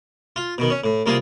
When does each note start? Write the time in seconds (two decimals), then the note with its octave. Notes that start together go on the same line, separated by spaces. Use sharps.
0.36 F4
0.58 B2 D#3
0.70 C#4
0.84 A2
1.06 C2 A#3 F4 G#4